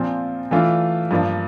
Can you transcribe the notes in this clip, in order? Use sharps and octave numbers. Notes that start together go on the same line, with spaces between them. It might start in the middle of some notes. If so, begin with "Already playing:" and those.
Already playing: A#2 F3 C4 F4
E3 A3 D4 F4
G2 F3 A#3 D4